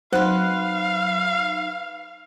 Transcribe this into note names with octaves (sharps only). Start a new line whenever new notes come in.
F#3 D#4 B4 C5 F5 F#5